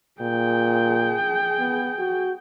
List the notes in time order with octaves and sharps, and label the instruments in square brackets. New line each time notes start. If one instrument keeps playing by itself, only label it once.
[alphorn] A#2 [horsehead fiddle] G#4 G5
[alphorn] B3
F#4